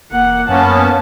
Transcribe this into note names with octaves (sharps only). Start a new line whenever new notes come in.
E1 A#3 F#5
F#2 A#3 B3 C#4 A5